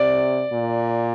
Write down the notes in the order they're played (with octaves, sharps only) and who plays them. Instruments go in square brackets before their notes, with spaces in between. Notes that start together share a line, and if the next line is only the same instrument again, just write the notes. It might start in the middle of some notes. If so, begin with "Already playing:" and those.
Already playing: [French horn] C3 [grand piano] D5
[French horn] A#2